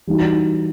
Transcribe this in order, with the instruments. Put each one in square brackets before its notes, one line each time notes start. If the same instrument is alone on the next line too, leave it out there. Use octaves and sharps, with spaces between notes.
[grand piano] E3 G3 D#4 F#4